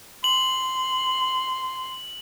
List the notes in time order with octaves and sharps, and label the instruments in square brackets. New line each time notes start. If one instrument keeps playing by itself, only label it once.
[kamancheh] C6 [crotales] F#7